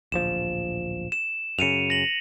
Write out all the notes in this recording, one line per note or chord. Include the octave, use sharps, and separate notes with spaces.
D1 A#1 F3 E7
E7
F#2 C#3 C#7 D#7 F7
A#6 F#7